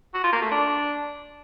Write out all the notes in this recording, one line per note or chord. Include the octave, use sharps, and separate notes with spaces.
F#4
F4
A#3
A3
D4